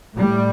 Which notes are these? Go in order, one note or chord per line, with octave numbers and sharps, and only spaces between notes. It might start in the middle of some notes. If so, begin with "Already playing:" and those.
A2 G3